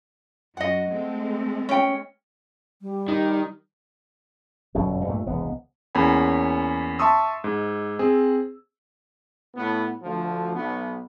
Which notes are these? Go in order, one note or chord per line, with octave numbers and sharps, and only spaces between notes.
F#2 F#4 D#5 F#5
G#3 A3 C4
C#4 G5
G3
D#3
G1 F#2 B2 F#3
G2 A#2 A3
E1 C2 B3
E2 A#3 C#4 C#5 G#5 B5
E5 A5 C6 C#6 D#6 E6
G#2
C4 G#4
A2 B3
D2 F3
B1 B3